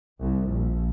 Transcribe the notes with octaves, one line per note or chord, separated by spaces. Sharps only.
C2
A#1